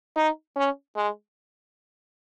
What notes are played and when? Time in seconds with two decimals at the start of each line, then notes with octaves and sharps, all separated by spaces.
0.16 D#4
0.56 C#4
0.96 G#3